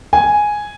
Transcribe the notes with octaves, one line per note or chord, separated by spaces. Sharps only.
G#5